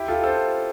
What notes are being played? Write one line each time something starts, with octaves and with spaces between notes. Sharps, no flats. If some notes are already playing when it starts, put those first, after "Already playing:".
Already playing: E4 G4
F4 A4
A4 C5